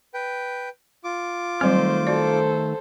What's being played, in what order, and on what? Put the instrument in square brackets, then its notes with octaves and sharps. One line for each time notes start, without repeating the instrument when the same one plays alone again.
[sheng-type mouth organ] B4 G5
F4 D6
[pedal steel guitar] D#3 A3 F6 [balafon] F#3 G3 C4 [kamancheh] C5
[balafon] F#4 D5 [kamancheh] A4 C5